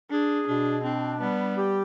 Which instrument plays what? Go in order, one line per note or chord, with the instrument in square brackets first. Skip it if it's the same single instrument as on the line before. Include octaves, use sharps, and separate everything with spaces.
[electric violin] D4 [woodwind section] G#4
[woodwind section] B2 [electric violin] D4
[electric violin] C4 [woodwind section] D4
[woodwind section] G3 [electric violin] B3
[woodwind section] G4